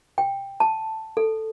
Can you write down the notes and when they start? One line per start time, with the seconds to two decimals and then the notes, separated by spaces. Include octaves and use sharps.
0.18 G5
0.60 A5
1.17 A4